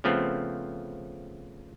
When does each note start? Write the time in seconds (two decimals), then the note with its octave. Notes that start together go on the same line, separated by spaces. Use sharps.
0.04 C#3 F3 A3 B3 C4